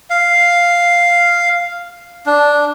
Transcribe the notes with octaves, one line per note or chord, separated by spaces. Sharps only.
F5
D4